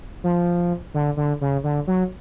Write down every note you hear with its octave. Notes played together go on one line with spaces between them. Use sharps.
F3
D3
D3
C#3
D3
F#3